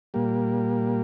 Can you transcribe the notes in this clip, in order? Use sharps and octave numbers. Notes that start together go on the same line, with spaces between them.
A#2 G3 A#3